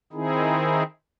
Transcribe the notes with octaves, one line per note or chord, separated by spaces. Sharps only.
D#3 C4 D#4 E4 G#4